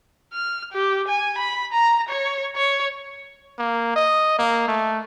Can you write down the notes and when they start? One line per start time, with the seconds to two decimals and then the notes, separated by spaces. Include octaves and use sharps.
0.33 F6
0.73 G4
1.08 G#5
1.38 B5
1.72 A#5
2.09 C#5
2.56 C#5
3.58 A#3
3.96 D#5
4.38 A#3
4.68 A3